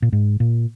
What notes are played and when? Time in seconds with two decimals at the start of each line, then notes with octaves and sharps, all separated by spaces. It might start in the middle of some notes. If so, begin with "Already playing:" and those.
0.02 A#2
0.12 G#2
0.40 A#2